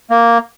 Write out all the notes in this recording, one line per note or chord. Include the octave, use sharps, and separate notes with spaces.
A#3